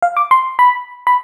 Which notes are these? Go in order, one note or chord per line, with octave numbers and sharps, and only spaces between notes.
F5
D6
C6
B5
B5